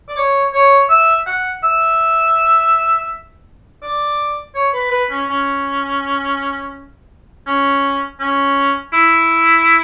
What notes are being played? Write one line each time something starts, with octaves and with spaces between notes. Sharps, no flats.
D5
C#5
C#5
E5
F#5
E5
D5
C#5
B4
B4
C#4
C#4
C#4
C#4
E4